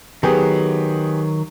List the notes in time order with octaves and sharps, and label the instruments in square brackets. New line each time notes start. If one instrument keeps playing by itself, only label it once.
[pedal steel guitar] D#3 F#3 [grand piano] B3 G4 G#4